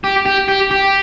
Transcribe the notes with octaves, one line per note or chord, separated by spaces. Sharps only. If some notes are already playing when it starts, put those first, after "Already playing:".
G4
G4
G4
G4